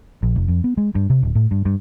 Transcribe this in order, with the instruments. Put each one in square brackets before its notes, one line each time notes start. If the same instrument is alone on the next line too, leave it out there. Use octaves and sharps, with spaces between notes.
[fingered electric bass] A#1
F1
F2
B3
G#3
G2
C3
D1
A2
G2
G2